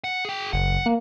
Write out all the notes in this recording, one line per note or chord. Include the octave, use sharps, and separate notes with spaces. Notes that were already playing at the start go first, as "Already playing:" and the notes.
F#5
G#4 G5
F#1 F#5
A#3